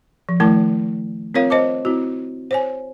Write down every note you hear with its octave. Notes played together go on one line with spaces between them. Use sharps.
F3
D#3 F3 A3 E4 A#4 A5
C4 F4 A#4 C#5 F5
C5 D#5 A5 D6
C4 E4 F#4
C5 C#5 G#5